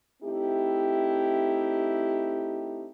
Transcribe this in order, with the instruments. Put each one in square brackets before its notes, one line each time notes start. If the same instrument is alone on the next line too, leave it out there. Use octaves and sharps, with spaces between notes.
[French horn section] A3 C4 D#4 E4 G4